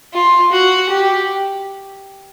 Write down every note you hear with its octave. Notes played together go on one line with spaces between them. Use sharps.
F4
F#4
G4